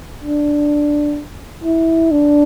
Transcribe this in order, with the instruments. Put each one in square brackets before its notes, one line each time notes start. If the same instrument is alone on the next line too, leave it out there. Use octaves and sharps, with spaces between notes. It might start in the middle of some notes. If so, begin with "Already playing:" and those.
[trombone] D4
E4
D4